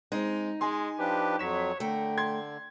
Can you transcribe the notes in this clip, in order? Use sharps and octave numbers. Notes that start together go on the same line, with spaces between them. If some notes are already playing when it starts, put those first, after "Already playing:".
G#3 C4 D#4
G#3 G#5 C6
F3 D4 G4 B4
F2 F#3 C#5 B6 E7
D3 A3 A#4 G5
C6 G#6